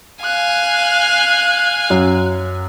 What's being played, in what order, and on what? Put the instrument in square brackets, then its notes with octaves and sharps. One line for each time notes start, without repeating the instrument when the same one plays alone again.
[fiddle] F5 G#5 [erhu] F#6
[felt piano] F#2